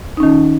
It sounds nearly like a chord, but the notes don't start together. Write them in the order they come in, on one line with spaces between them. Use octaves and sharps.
D#4 C#4 D#3